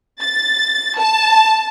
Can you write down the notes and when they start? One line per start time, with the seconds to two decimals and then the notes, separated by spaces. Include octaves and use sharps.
0.22 A6
0.98 A5